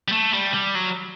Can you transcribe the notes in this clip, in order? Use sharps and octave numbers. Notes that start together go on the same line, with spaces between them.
G3
A3
G3
G3
F#3